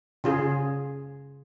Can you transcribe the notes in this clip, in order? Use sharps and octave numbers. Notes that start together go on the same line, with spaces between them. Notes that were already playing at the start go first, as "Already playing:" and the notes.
C#3 F4 G#4